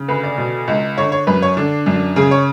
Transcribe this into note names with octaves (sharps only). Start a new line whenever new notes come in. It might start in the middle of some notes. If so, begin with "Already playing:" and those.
Already playing: C#3
D2 B4
D5
B2
C#2
D3 C#5
C#5
F#2 B4
C#5
D3 D4
F#2 D4
C#3 G#4
C#5